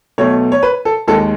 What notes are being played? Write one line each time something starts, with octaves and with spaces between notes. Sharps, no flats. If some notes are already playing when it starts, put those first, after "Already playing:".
B1 B2 A3 C#5
C#5
B4
A4
D#2 D#3 G#3 A4